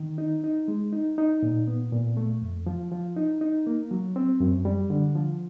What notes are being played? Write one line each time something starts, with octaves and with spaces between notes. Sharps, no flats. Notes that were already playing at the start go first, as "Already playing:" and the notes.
Already playing: D#3
D#4
D#4
G#3
D#4
D#4
A#2
B3
A#2
A3
F2
F3
F3
D#4
D#4
A#3
F#3
C4
F#2
G3
D3
F3